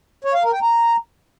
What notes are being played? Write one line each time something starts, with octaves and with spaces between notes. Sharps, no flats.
C#5
F5
A#4
G5
A#5